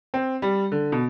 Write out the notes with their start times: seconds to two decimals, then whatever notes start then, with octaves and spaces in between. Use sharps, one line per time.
0.14 C4
0.42 G3
0.72 D3
0.92 B2